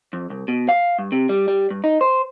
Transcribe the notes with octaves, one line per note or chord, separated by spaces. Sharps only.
F2
C2
B2
F5
G2
C3
G3
G3
G2
D#4
C5